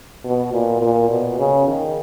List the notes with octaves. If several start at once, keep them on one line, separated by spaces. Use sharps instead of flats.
B2
A#2
A#2
B2
C#3
D#3